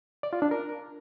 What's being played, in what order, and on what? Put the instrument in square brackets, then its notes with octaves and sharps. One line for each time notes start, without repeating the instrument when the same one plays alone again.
[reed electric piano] D5
F4
D4
A#4